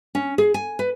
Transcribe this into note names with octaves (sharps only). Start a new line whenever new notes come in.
C#4
G#4
G#5
B4